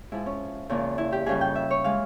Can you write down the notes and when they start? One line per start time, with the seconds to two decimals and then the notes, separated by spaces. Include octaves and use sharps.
0.12 G#2 F3 G#3 E4
0.26 C#4
0.69 E2 C#3 F3 A#3
0.98 E4
1.12 G4
1.26 F2 C#3 G3 G#4
1.41 G5
1.55 E5
1.71 C#5
1.84 E3 G#3 F5